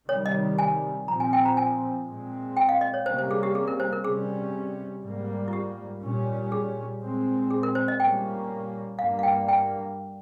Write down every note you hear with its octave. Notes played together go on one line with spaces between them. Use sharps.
C3 D#3 G3 C#5
D#5
G#5
A#2 F3 C4 A#5
G#5
G5
A#5
G#5
A#2 G#3 C4
G5
F5
D#5
C#5
C3 G3 A#3 C#4 C5
C5
G#4
G4
G#4
A#4
C5
A#4
C3 G3 C#4 G#4
G#2 G3 A#3
F4
G4
A#2 G3 C#4
G#4
A#2 G#3 C4
G#4
A#4
C5
D#5
A#2 G3 A#3 C#4 G5
G2 G3 A#3 F5
F5
G5
G5